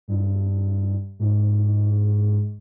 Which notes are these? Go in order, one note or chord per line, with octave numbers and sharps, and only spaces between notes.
G2
G#2